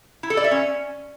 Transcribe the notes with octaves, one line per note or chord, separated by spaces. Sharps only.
E4
A4
D5
E5
C#4